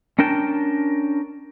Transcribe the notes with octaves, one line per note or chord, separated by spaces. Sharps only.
C#4 D4 A#4 G5 A5